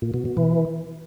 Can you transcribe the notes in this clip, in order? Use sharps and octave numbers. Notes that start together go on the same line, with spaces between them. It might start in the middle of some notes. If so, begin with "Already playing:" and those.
A#2
B2
B2
E3